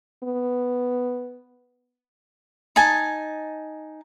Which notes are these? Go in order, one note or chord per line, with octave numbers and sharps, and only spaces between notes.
B3
D#4 G#5 A5